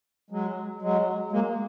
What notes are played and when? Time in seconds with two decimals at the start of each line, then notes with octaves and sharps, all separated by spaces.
0.30 F#3 G#3
0.82 F#3 G#3
1.32 G#3 A#3